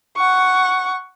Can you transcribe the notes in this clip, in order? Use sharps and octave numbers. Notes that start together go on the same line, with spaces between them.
F#5 C#6